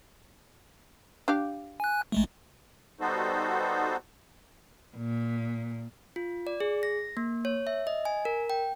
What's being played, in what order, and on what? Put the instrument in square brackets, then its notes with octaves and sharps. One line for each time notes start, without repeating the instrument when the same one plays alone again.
[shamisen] D4 G4 F5
[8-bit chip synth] G#5 F#6
A1 G#3 A3
[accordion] G3 B3 D#4 F#4 A4 C5
[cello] A#2
[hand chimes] F4
D5
G#4
A#6
A#3
C#5
E5
D#5
G#5
A#4
G5